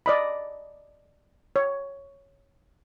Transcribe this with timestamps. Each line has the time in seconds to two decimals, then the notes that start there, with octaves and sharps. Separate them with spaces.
0.06 D5 D#5 B5
1.56 C#5